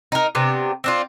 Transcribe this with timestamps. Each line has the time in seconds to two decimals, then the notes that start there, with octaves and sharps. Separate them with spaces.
0.12 D#4 A#4
0.35 C3 B3 D4 G4
0.84 C4 D4 F4